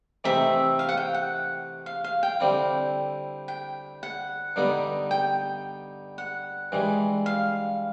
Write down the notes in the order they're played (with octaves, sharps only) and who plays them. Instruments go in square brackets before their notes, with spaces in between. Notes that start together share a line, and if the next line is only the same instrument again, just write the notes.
[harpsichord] C3 E3 A3 C4 D#4 [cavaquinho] E5
[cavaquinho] F5
F#5
G5
F#5
F5
F5
G5
[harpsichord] D3 G3 C4 E4
[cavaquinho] G5
F#5
[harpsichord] G2 D3 G3 B3 D#4
[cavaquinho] G5
F#5
[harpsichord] G2 E3 G#3
[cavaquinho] F5